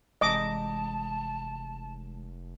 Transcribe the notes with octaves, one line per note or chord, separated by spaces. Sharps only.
F1 C3 E3 G#3 D#5 A5 D6